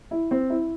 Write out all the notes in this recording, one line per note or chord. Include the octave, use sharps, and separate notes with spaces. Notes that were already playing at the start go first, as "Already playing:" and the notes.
E4
C4
E4